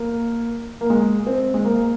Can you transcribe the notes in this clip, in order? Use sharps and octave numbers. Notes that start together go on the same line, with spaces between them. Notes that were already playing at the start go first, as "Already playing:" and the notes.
Already playing: A#3
A#3
G#3
C4
G#3
A#3